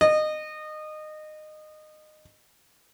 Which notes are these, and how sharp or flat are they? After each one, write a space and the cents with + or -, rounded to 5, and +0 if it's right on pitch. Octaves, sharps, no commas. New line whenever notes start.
D#5 -20